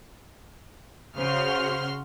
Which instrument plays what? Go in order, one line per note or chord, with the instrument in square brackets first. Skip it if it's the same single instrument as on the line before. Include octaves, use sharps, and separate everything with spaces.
[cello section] C#3 [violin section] F#4 C6 F6 [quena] C5